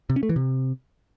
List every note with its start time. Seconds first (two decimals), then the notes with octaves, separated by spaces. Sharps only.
0.10 C3
0.16 C#4
0.23 A3
0.29 E3
0.36 C3